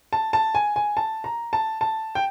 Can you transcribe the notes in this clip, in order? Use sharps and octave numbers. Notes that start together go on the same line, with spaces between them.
A5
A5
G#5
G#5
A5
A#5
A5
A5
G5